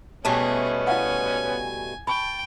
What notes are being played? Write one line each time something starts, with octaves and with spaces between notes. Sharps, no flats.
B2 G3 A3 B3 C#4 G#4 A5
E4 F5 F#5 G#5
G5 A5 B5 C#6